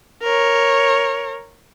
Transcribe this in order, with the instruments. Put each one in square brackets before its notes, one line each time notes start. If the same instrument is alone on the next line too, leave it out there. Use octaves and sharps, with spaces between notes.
[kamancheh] A#4 C#5